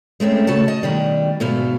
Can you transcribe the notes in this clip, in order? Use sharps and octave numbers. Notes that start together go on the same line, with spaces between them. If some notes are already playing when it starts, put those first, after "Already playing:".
G#3 A3 C4 C#4
C#3 A3 F#4 A5
D#5
B2 D#3 G3
D2 G#2 B2 E3 F5